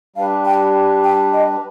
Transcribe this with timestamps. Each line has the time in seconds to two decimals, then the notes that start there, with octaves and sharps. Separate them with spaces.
0.16 G3 D4 G4 B4 F5
0.45 G5
1.04 G5
1.33 D#5